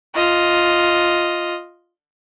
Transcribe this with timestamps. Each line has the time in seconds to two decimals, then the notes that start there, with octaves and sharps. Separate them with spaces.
0.15 F4 D#5